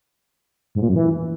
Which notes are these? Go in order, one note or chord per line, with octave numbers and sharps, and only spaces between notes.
G#2
A#2
F#2
E3